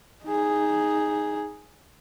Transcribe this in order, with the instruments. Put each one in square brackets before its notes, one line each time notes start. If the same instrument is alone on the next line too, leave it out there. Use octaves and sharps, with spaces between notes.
[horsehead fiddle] D#4 G#4